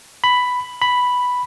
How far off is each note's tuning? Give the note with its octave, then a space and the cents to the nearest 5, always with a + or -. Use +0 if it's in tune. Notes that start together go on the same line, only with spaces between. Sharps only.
B5 +5
B5 +0